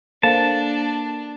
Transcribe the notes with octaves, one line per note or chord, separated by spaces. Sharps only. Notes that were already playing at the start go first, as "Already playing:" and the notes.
A#3 D4 A4 C5 F5 A5